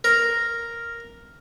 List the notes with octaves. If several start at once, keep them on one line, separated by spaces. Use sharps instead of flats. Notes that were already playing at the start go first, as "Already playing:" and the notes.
A#4